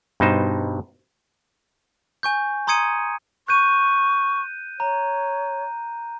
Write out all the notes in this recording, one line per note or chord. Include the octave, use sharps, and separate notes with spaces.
G2 B2 D#4 C5
G#5 C#6 G6
A#5 C6 D#6 G#6 C#7 D#7
C#6 F#6 G6 D#7
C#5 A#5